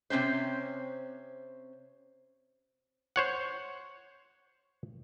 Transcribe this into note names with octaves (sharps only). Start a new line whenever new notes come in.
C3 E3 C4 C#4 C5
C5 C#5 F#5